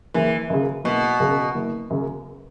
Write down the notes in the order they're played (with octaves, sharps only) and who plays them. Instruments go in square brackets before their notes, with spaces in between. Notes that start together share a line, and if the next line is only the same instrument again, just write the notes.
[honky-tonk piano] F#1 [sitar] E3
[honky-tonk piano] F#2 C#3
[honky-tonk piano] F#1 [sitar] B2
[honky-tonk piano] F#2 C#3
F#1
F#2 C#3